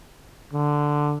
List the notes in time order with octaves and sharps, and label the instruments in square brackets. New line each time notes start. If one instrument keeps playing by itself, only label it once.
[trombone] D3